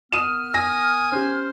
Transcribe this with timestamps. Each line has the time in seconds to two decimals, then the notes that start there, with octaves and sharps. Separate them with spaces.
0.12 A#3 B3 D#6 F6 D#7 E7
0.54 G#5 D#6 A#6
1.12 C#4 G4 C5